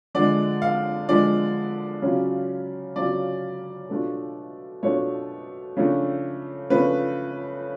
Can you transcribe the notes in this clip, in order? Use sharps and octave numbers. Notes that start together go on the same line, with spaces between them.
D3 F3 G#3 D5
F5
D3 F3 G#3 D5
C#3 F#3 C#4 F4
C#3 F#3 C#4 F4 D5
B2 A3 D4 F4
B2 A3 D4 F4 C#5
C#3 F3 A3 D4
C#3 F3 A3 D4 B4